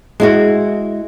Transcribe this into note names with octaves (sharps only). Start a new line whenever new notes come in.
G#3 E4 F#4